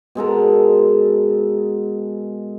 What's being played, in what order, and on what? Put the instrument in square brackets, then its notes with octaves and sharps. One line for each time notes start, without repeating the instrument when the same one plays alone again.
[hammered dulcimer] B2 G#3 A4 A#4